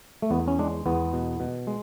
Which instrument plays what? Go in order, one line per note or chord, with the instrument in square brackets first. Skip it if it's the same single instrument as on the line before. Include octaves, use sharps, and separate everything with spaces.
[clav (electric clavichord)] A3
E2 B3
C#4
G#3 D4
E2 B3
B2
B2
G#3